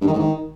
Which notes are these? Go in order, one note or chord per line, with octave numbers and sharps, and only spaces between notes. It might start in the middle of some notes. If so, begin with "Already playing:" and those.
G2
D#3
G#2
D#3